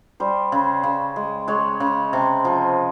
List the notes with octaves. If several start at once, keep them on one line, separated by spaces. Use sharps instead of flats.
G3 C5
C#3
C#3
G#3
G#3 C#5
C#3
C3
F3